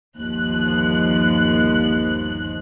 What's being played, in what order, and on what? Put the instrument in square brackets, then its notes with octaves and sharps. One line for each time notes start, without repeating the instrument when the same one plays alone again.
[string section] G1 D#2 F3 F#6